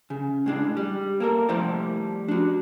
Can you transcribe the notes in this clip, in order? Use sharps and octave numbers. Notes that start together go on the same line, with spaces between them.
C#3
A2 G#3 D4
G3
A#3 A4 A#4
F3 G3 A3 E4 C5 D5
D4 F#4